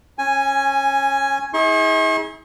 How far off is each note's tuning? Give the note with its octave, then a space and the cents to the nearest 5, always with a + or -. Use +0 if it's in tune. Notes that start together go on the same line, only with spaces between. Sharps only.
C#4 -25 G#5 +0
E4 -45 G#4 +0 C#6 -45